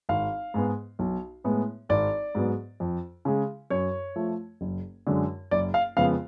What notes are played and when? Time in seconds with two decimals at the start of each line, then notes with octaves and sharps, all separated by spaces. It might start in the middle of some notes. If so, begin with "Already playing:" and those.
0.09 G#1 F5
0.54 G#2 G#3 B3
0.99 B1
1.44 A2 G#3 B3
1.89 G#1 D5
2.35 G#2 F#3 B3
2.80 F2
3.25 C#3 G#3
3.70 F#2 C#5
4.16 F3 A3
4.61 F#1
5.07 F#2 D3 G#3
5.51 F#1 D5
5.74 F5
5.97 F2 C#3 G#3 B3 F5